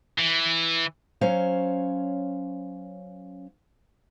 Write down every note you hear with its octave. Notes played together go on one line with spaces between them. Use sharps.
E3
F#3 C#4 C5 C#5 F5